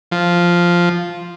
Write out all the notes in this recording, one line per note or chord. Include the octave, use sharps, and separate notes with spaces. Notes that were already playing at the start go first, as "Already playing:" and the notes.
F3